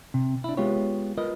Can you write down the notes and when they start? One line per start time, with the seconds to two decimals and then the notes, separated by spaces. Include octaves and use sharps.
0.14 C3
0.44 D4 E4
0.57 G#3 B3 F4 G4 C#5
1.17 F4 A#4 B4 D#5